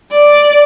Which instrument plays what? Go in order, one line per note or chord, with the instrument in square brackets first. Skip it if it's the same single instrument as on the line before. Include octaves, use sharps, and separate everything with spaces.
[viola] D5